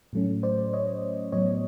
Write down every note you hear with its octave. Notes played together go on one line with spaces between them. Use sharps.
A2 F#3 A3 C#4
C5 D5
C#5 D#5
A2 F#3 B3 C#5 D#5